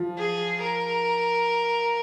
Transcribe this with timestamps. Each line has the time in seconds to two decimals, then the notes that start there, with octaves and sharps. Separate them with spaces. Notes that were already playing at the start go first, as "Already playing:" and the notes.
Already playing: F3
0.18 G#4
0.62 A#4